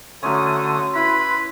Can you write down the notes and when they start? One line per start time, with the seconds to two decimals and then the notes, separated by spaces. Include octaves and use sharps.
0.23 D3 F#3 A3 C#4 C6 D#6
0.95 E4 B4 B5